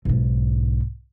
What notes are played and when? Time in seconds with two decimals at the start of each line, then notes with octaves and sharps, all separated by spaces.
0.05 B1 G#2